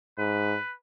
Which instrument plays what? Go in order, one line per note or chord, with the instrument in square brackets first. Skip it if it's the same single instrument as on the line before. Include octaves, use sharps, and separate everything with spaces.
[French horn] G#2 [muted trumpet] B4